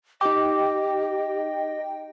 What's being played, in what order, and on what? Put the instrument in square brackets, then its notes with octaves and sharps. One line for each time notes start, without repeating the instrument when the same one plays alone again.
[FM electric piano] D#4 G5 [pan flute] G4 [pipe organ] D#5 [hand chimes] D6